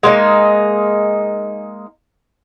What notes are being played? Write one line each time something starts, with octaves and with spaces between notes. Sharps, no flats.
G#3 A#3 D#4